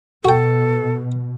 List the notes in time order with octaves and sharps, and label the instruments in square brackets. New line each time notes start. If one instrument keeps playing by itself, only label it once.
[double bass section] B2 [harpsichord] F#4 G5 [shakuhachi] A4